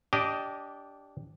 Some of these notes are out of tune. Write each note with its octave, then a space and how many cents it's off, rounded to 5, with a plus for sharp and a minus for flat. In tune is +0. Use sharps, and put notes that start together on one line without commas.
D4 -20 G4 -5 D#5 +0